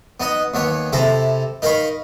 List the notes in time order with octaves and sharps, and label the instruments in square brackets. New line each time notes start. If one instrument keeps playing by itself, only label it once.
[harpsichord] B3 D#4 D#5
D#2 B3 C#5
C3 E4 A4 A#5
D#4 A#4 F5 B5 C#6